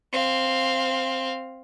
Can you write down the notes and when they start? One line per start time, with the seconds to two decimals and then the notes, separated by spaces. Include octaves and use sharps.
0.12 C4 F5